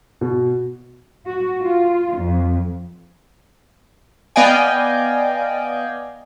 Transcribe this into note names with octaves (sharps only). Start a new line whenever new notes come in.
B2
F#4
F4
F2
B3 D5 D#5 F5 G5 G#5